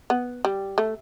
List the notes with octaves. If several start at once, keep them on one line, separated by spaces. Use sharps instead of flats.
B3
G3
A3